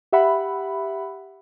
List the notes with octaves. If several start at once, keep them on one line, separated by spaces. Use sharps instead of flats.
G4 E5 F#5 B5